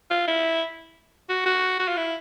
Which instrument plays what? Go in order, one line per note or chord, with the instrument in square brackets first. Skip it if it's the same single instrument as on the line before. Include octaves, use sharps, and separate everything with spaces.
[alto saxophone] F4
E4
F#4
F#4
F#4
F4
E4